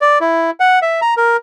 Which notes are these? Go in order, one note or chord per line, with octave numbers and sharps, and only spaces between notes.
D5
E4
F#5
E5
A#5
A#4